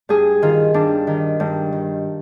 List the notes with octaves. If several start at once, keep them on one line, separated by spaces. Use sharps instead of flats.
G2 G#4
D#3 F4
G2 D4
D#3
G2
D#3